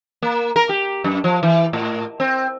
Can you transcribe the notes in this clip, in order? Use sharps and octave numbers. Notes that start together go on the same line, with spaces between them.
A#3
A#4
G4
F#2
F3
E3
A2
C4